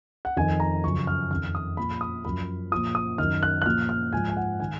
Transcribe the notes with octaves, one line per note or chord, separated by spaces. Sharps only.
F#5
F2 D#3 G#5
A#5
F#2 C#3 F3 C#6
F6
F2 D#3 F6
D#6
A#2 F3 B5
D#6
F#2 F3 B5
A#2 F3 D#6
D#6
F#2 D#3 F6
F#6
F#6
A#2 F3 F6
F6
G#2 F3 G#5
G#5
F#5
D#3 G#5